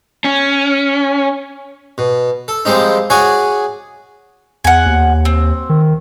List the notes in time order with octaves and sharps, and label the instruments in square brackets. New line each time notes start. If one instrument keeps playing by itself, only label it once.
[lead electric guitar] C#4
[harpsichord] B2
A4
F3 G3 G#3 C4 D#4
F#4 G#4 C#5 D5 G#5
[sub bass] E2 [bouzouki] F#5 G#5
[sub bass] D#2
[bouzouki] C4
[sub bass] D#3